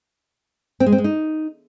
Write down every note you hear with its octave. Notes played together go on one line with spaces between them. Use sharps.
C4
G#3
C4
G#3
D#4